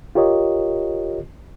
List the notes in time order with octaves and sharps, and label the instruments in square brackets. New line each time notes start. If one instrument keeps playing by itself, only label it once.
[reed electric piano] F4 G4 A#4 C#5 D#5